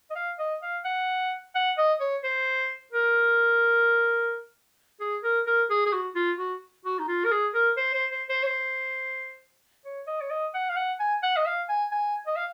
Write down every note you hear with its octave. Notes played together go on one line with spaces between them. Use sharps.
D#5
F5
D#5
F5
F#5
F#5
D#5
C#5
C5
A#4
G#4
A#4
A#4
G#4
G#4
F#4
F4
F#4
F#4
D#4
F4
A#4
G#4
A#4
C5
C5
C5
C5
C#5
C5
C#5
D#5
C#5
D#5
F#5
F5
F#5
G#5
F#5
D#5
F5
G#5
G#5
D#5
F5